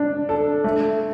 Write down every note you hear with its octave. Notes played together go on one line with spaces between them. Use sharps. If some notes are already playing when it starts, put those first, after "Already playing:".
Already playing: D4
A4
A3